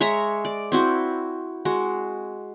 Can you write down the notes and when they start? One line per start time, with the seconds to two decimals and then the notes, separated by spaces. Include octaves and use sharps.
0.01 G#3 C#5 E5 A#5
0.45 D5
0.72 C4 E4 F#4
1.65 G#3 F#4